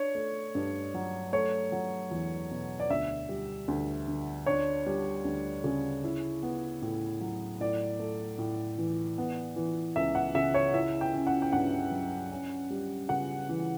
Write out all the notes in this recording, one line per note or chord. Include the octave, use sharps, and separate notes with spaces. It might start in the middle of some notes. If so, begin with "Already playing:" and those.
Already playing: D4 C#5
A3
G2
F#3
A3 C#5
F#3
E2
B2
D5
D2 E5
G3
D2
D3
D4 C#5
G3
D2
C#3
E4
B3
A2
F#3
A2 D5
A3
A2
E3
B3
E3
C#2 E5
F#5
C#3 E5
C#5
E4 E5
G5
C#4
F#5
G5
G2 F#5
F#3
C#4
G3
C#3 F#5
E3